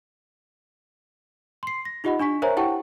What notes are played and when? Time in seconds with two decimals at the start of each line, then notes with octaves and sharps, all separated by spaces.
1.63 C6 C7
1.85 A#6
2.04 D#4 F4 G4 D#5 F#5 B5
2.20 D4 G#5 C#6 B6
2.42 A#4 C5 C#5 E5 G#5 A#5
2.57 E4 G4 F#5 G5 A5 C#6